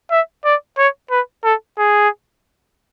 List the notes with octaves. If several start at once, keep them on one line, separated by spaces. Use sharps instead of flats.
E5
D5
C#5
B4
A4
G#4